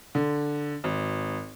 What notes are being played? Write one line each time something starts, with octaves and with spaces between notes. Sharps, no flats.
D3
G#1